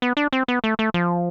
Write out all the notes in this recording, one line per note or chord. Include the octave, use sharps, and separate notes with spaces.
B3
D4
C4
B3
A3
A3
F3